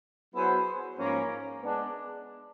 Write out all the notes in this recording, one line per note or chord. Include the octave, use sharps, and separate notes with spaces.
F#3 B3 E4 G#4 C5
G#2 F3 A#3 C#4
G#3 B3 D4